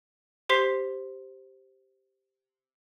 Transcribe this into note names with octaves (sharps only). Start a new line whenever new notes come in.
G4 C5 C6 B6 C7